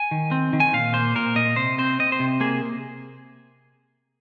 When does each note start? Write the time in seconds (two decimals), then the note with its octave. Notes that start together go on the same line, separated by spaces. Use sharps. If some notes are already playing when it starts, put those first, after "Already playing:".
Already playing: G#5
0.11 D#3
0.31 C4
0.53 D#3
0.60 G#5
0.73 A#2 F5
0.94 A#3 C5
1.16 A#2 A#4
1.35 A#2 D#5
1.56 C3 C5
1.78 C4 C5
1.99 C4 D#5
2.12 C5
2.19 C3
2.40 A#3 G#4